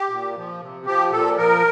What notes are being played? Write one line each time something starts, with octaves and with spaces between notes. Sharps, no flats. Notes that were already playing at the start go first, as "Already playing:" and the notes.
Already playing: G4
A#2
F3
C3
F3 G4
A#2 A4
F3 A#4